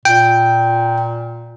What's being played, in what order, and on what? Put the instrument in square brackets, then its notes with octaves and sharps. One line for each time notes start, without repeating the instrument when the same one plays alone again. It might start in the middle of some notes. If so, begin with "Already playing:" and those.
[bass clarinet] A#2 [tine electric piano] G5